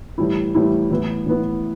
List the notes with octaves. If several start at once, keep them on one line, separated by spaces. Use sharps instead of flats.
A2 E3 G3 E4
A2 E3 G3 E4
A2 E3 B3 E4
A2 E3 B3 E4